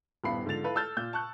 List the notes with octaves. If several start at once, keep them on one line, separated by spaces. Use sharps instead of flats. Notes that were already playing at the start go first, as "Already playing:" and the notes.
D#1 G2 B3 E4 B5 C7
G#2 D3 F3 A6 F7
E4 F4 A4 B4
A4 A5 E6 F6 G6 A6
A#2 G6
A5 C#6 F#6 G6